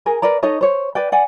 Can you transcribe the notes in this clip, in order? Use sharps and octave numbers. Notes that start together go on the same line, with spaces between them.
G#4 A#4 G#5
A#4 B4 D5 A#5
D#4 A4 C#5 D#5
C5 C#5
B4 D5 G5
D5 F#5 G#5